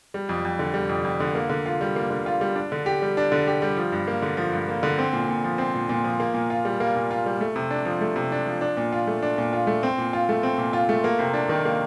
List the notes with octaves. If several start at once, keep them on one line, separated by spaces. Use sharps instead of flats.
G3
F2
F2
D3
G3
F2
F2
D3
A#3
D3
F4
G3
A#3
D3
F4
G3
D4
D3
G4
G3
D4
D3
G4
G3
F3
G2
A#3
D3
F3
G2
A#3
D3
C4
A#2
A#2
F3
C4
A#2
A#2
F3
A#3
A#2
F4
G3
A#3
A#2
F4
G3
A3
C3
D4
F3
A3
C3
D4
F3
D4
A#2
F4
A3
D4
A#2
F4
A3
C4
A#2
F4
A3
C4
A#2
F4
A3
A#3
C3
D4
D#3
A#3